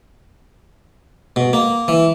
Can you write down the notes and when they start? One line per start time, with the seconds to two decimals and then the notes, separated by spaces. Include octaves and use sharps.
1.36 B2
1.53 A#3
1.88 E3